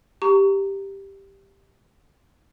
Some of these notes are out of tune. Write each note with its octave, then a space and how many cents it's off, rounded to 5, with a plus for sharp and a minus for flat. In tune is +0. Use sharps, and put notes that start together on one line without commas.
G4 +0 A#5 -15 C#6 +20